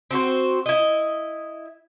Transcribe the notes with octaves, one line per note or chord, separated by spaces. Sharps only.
C4 F#4 C5
E4 D#5